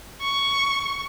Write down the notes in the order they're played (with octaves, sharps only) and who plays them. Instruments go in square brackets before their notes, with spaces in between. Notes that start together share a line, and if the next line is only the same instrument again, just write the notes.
[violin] C#6